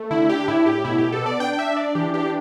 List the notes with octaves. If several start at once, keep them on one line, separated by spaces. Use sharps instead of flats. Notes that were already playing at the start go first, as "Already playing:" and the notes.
Already playing: A3
D3 E4
D4 G4
A2 E4
A2 G4
B2 E4
G4
B2
A4
B3 D5
D4 G5
G5
D4 E5
D4 D5
E3 G4
D4 G4